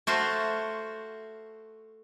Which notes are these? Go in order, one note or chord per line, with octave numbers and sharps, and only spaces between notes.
A3 F#4 C5 F5